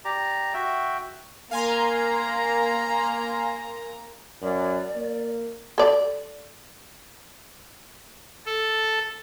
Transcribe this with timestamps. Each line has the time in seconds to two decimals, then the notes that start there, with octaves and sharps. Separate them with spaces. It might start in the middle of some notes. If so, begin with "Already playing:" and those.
0.05 G4 D5 A#5
0.54 F#4 E5 G5
1.51 A#3 F5 G#5 A#5 C6
4.42 F#2 D5
4.95 A#3
5.78 A4 D5
8.46 A4